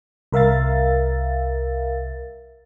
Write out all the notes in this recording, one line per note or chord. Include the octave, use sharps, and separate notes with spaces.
C2 A#4 E5 F5 A6